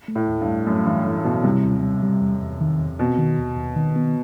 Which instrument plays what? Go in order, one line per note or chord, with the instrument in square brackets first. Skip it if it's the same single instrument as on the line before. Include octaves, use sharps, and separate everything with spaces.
[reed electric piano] A3
[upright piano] A2
[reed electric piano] D#2
[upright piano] G2
[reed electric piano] A3
[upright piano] F#2 [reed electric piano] A3
[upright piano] G2 [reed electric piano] E3
[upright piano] A2 [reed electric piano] E3
[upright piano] B2 [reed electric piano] E4
[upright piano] C3 [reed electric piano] G3
[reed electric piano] D#2
G3
G3
E2
E2
D#3
E2
[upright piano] B2 [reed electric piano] C4
[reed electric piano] D#3
D#2
D#2
D#3
B3